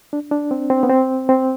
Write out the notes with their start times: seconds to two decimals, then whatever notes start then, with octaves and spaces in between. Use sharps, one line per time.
0.13 D4
0.31 D4
0.51 C4
0.70 C4
0.83 B3
0.90 C4
1.29 C4